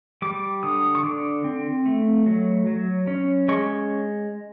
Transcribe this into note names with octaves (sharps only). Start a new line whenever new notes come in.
G3 D6
D3 D#6
C#6
D3 D6
C4
A3
F#3
F#3
C#4
G#3 C#6